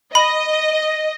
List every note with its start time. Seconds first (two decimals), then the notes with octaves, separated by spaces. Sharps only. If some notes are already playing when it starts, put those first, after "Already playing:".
0.15 D#5 B5